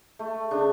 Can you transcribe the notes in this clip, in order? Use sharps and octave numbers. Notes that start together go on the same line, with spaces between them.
A3
C#3 D4